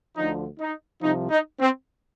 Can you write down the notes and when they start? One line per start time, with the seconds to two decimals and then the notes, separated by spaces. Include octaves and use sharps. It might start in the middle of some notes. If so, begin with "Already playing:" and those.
0.17 D2 D3 F3 D#4
0.60 D#4
1.02 C2 C3 F3 D#4
1.30 D#4
1.60 C4